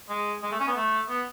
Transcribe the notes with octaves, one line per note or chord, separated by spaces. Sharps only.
G#3
G#3
A3
C#4
B3
A3
B3